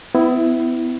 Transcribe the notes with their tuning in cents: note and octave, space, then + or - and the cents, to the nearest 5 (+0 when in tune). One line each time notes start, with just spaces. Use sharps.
B3 +35 E4 +0